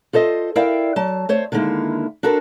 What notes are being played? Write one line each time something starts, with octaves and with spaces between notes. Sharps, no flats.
F4 A4 C5 D#5
E4 A#4 D5 E5 F5 G5
F#3 A5
A3 C5 C#5
D3 D#3 G#3 A#3 E4
D4 F#4 A4 A#4 C5